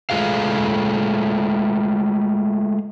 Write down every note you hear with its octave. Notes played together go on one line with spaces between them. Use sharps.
G#3 A3 F4 G#4 F5